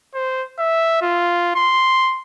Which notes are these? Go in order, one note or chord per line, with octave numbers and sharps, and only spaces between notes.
C5
E5
F4
C6